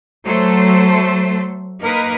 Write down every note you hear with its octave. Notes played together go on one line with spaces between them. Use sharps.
F#3 A3 A4 C5
A#3 D#4 A#4 B4